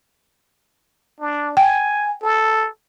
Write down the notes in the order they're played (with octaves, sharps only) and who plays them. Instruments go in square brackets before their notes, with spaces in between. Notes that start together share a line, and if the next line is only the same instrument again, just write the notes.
[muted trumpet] D4
[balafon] G5 [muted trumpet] G#5
[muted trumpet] A4